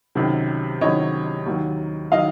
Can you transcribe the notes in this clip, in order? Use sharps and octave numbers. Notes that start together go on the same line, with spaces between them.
C#2 C3 D#3 F#3
C#2 C3 D#3 F#3 C#5 D#5
D#2 D#3 F#3
D#3 F#3 D#5 F5